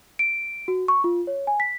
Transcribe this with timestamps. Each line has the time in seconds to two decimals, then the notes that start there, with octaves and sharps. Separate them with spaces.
0.19 D7
0.68 F#4
0.88 C#6
1.04 F4
1.27 C#5
1.47 G#5
1.60 B6